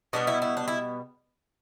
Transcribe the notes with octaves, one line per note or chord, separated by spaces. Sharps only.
B2 G3 B3 D4
E4
E4
D4
E4